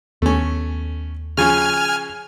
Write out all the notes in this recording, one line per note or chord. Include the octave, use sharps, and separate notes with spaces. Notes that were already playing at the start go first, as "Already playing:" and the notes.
D#2 A3 B3 C#4
C#3 F3 C#4 G#5 F6